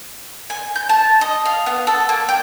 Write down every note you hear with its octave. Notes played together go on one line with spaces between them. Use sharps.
G#5
G6
A5
D#5
F5
B3
A4
A#3
G5